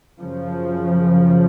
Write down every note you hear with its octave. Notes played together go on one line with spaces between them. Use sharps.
F#2 C#3 F3